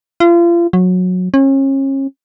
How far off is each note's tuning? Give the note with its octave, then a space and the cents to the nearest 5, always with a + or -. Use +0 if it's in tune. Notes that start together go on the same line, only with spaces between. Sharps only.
F4 -35
F#3 -20
C#4 -35